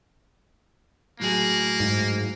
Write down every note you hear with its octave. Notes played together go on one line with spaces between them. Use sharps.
A2 F#3 A#3 G#4
G#2